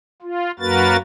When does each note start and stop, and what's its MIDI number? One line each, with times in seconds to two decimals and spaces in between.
0.22 0.51 65
0.59 0.97 42
0.59 0.97 58
0.59 0.97 66
0.59 0.97 70
0.59 0.97 71
0.59 0.97 93